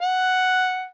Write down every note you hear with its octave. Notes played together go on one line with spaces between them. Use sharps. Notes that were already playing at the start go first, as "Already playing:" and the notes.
F#5